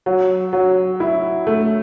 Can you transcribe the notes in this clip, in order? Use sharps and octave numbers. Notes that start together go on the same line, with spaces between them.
F#3
F#3
E4
A3